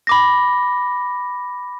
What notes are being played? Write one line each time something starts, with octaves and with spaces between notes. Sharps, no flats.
B5 D6 A#6